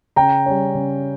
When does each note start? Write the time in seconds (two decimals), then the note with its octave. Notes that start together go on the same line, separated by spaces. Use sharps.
0.16 C#3 G5 A#5
0.46 G3 C#4
0.75 C#3